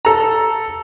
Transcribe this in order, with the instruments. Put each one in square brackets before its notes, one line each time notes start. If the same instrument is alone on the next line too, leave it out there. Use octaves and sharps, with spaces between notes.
[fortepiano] A4 A#5